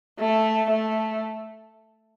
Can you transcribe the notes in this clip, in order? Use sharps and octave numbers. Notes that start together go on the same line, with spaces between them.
A3
A3